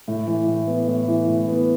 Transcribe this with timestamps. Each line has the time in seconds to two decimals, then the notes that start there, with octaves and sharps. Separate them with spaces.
0.08 A2
0.27 E3
0.48 A2
0.67 B3
0.88 A2
1.08 E3
1.28 A2
1.48 B3